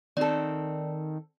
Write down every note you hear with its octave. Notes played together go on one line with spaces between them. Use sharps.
D#3 C4 A4 D5